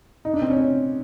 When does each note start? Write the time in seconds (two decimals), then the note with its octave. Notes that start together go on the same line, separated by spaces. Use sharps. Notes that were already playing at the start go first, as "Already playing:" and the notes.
0.25 D#4
0.33 D4
0.42 C4
0.50 C#4